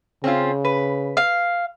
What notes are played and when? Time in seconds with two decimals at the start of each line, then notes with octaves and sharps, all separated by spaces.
0.24 C#3 C4 C#4 F4
0.65 B4
1.17 F5